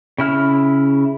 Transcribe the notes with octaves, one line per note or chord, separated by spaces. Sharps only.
C#3 E4 F6